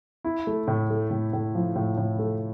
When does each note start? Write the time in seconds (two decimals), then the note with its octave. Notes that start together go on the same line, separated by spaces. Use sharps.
0.24 E4
0.47 A3
0.68 A2
0.90 A3
1.11 A2
1.33 A2
1.55 F3
1.76 A2
1.97 A2
2.19 A3